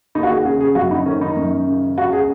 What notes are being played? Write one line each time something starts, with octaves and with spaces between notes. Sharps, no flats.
D#2 D#4
F#4
G#4
C#3 G#4
G#4
F#2 F#4
D#4
D#3 C#4
D#4
F#2
C#3
C#2 F#4
G#4